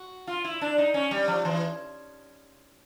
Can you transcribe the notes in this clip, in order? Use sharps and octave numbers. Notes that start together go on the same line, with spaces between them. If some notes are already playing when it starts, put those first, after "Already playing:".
Already playing: F#4
F4
E4
D4
D#4
C#4
G3
F3
E3